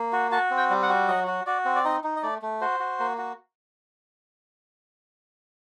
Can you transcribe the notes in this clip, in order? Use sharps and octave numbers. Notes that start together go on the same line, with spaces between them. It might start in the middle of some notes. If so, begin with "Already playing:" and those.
Already playing: A#3
F#4
F#4 A5
C4
G5
G3
F#5
F#4
F#3 D#5
F#4
F#4 D5
C4
D5
D#4 D#5
D#4
D#5
A3 D5
A3
F#4 C5
F#4
A#3
F#4